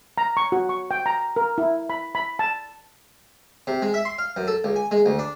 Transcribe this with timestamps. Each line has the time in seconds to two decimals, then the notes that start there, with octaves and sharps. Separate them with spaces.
0.18 A#5
0.37 C#6
0.52 F#4
0.69 C#6
0.91 G5
1.06 A#5
1.36 A#4
1.58 E4
1.90 B5
2.15 B5
2.39 A5
3.67 C3
3.82 G#3
3.94 E5
4.05 C6
4.18 F5
4.36 F#2
4.48 A4
4.64 C#2
4.76 G#5
4.91 G#3
5.06 D2
5.19 D4